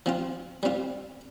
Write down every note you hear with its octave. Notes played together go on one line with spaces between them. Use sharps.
F3 C4 F4
G3 C4 F4